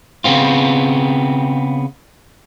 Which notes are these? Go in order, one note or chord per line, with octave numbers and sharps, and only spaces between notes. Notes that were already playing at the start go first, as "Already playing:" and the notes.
C#3 B3 C4 F4